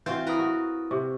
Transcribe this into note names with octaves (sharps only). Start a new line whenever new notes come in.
E3 C4 F4 F#4 G6
E4 A#4 B4 A#5 D#6
F#4
C3 C#6